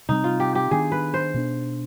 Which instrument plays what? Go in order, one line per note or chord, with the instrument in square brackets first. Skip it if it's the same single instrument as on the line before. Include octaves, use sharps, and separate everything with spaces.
[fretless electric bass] C3 G3 C4 [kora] D#4
[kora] F4
G4
G4
[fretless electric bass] D#3 B3 D4 [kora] G#4
[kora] B4
C5
[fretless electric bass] B2 B3 D4